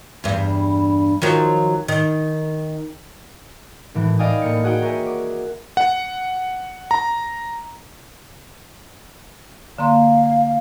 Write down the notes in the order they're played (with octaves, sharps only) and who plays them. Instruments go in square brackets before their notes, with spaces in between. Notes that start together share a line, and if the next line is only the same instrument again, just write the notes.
[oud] E2 G2
D#3 F3 F#3
D#3
[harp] G#1 A2 E3
D5 D#5 F5 G5 G#5 D#6
A2 A#3 C#7
F#4 G#4 F#5 G5 D#6
A#4 C#5 E5 F#5 G#5
D6
[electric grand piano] F#5
A#5
[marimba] D3 A#3 C6 [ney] F5